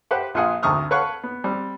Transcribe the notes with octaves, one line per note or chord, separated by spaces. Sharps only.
G4 B4 C5 E5 F#5
A#1 F4 G#4 F#5 G#5 D#6
G#1 D2 A#5 C#6 D#6 F6
A4 B4 C#5 F5 F#5 C#6
B3
G3 C4